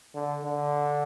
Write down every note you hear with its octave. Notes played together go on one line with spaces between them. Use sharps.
D3
D3